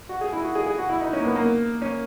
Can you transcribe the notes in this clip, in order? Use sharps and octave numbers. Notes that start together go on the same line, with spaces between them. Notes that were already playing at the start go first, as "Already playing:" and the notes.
F#4
G#4
E4
F#4
G#4
G#4
F#4
E4
D#4
C#4
A#3
B3
A#3
C#4